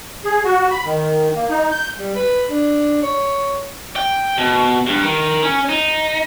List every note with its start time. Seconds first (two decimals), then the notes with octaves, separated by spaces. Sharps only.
0.24 G#4
0.44 F#4
0.71 B5
0.86 D#3
1.36 A#3
1.50 D#4
1.72 G6
1.98 G3
2.15 B4
2.49 D4
3.03 C#5
3.96 G5
4.38 B2
4.87 G2
5.03 D#3
5.43 C#4
5.69 D#4